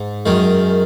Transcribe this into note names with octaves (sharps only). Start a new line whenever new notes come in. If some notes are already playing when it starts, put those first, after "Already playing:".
Already playing: G#2
F#2 D#3 G#3